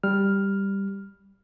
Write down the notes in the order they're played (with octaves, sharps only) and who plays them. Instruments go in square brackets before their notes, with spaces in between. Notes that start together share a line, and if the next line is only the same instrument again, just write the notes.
[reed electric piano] G3 F6